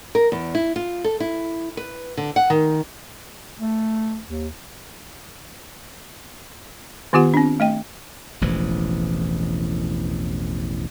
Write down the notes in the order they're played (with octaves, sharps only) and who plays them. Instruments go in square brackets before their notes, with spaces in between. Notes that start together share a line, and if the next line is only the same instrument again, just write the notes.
[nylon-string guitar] A#4
E2
E4
F4
A4
E4
B4
D3
F#5
D#3
[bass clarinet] A3
D#2
[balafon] D#3 B3 F4 G4 F#5
C4 D4
A3 D#5 G5
[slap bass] E1 A1 E3 F3